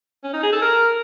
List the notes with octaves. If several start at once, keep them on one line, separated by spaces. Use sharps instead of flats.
C#4
D#4
G#4
A4
A#4